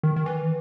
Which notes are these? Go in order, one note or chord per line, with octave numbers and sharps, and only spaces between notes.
D#3
D#3
E3